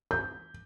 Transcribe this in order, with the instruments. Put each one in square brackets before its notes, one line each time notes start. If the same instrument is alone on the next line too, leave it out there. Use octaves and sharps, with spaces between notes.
[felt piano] G6